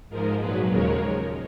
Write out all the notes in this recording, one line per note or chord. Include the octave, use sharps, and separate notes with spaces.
G#2 F3 G#3 A#4
A#2 F#3 G#4 B4
D#2 C#3 F3 G#3 A#4 C#5